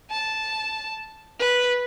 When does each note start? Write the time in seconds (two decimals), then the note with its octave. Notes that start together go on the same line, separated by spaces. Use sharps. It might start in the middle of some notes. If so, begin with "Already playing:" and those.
0.11 A5
1.39 B4